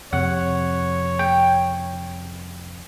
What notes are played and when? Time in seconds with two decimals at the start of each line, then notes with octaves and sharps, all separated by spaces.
0.13 F2 C3 C#5 F#5
1.19 G5